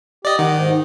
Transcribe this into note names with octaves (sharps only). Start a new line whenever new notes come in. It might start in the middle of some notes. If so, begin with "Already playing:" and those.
G4 D5 D#5
D#3 F#5
G#2